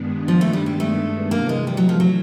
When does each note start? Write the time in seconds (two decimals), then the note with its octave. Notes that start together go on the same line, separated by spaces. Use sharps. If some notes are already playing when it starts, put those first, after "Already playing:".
Already playing: G2 D#3 G#3 B3 D4
0.28 F3
0.41 A3
0.53 G3
0.66 G3
0.80 A3
1.31 C3 E3 A3 A#3
1.49 G#3
1.67 G3
1.77 F#3
1.89 F3
2.00 F#3